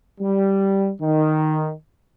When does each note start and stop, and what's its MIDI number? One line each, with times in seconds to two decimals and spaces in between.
0.20 0.90 55
1.01 1.72 51